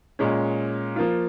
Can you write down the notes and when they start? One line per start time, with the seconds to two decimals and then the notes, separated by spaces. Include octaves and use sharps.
0.19 A#2 G#3 C#4
0.96 F3 A#3 F4